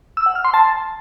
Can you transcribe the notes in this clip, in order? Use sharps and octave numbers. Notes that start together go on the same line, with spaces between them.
E6
F#5
F6
C6
A5